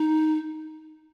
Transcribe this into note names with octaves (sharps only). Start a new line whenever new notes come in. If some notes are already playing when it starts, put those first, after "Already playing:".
Already playing: D#4